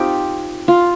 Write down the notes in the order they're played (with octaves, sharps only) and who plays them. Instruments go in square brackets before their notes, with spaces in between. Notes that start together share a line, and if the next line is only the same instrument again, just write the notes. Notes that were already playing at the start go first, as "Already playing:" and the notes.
Already playing: [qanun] C4 D#4 F4 G4
F4